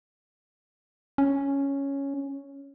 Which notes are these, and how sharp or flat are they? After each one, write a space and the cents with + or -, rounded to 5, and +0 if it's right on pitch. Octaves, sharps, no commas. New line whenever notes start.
C#4 +0